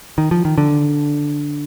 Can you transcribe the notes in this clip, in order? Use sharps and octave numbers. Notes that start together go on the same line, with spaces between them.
D#3
F3
D#3
D3